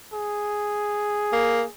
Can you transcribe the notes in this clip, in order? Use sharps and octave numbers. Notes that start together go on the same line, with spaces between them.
G#4
A#3